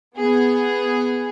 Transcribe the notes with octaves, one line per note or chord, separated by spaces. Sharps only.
B3 G#4